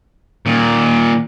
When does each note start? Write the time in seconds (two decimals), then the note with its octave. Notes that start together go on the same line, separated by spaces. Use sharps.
0.46 A#2 D#3